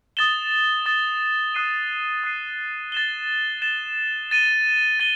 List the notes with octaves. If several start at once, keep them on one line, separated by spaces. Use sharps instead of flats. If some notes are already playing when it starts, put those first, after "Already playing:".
D#6 A6 E7 G7
D#6 A6 E7 G7
D#6 F#6 C7 D#7
D#6 F#6 C7 D#7
A6 E7 G7
A6 E7 G7
A6 D#7 G7
A6 D#7 G7